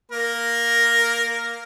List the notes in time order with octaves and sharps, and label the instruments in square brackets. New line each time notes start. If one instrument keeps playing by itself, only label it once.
[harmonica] A#3 A#4